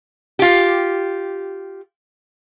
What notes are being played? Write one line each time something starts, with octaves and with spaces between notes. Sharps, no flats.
F4 G4